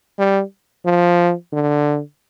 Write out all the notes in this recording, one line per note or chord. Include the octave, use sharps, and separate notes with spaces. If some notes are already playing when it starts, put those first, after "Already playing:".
G3
F3
D3